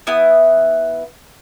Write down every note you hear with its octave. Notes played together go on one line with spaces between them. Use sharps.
B3 E4 D#6